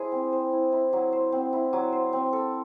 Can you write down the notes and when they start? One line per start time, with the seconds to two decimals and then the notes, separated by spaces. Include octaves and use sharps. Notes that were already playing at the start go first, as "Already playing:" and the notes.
Already playing: E4 G#4 C5
0.12 C4
0.33 C5
0.52 E4
0.72 E4
0.93 F#3
1.12 C5
1.32 C4
1.53 E4
1.73 F#3
1.92 C5
2.13 C4
2.33 A4